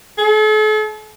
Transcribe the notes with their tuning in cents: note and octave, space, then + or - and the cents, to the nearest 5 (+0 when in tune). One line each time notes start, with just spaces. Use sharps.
A4 -45